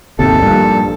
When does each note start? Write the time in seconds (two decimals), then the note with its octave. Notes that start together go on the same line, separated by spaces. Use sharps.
0.19 G#1 D#2 C3 A4
0.42 A#1 G2 A#2